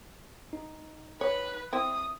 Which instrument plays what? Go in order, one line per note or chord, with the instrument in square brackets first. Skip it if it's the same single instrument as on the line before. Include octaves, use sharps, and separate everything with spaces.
[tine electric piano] D#4
[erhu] B4 [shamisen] C#5
[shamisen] C4 E4 [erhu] D#6